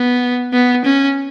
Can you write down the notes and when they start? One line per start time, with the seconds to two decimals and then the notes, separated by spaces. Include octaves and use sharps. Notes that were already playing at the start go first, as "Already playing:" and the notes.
Already playing: B3
0.53 B3
0.84 C#4